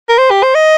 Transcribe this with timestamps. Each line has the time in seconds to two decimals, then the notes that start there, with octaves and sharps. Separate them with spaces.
0.09 A#4
0.18 C5
0.31 G4
0.43 C5
0.55 D#5